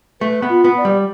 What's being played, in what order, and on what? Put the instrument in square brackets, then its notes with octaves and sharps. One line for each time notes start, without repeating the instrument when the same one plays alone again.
[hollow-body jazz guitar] A3 [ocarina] B4
[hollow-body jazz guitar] B3
[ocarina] F4
[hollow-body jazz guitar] B3
[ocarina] D5
[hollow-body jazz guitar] G3